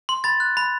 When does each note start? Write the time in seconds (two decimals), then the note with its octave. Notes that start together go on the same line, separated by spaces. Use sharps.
0.09 C6
0.24 B5 A6
0.40 F#6
0.57 B5